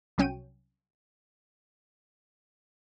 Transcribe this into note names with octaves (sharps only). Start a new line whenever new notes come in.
C2 F#3 C#4 G5 D#7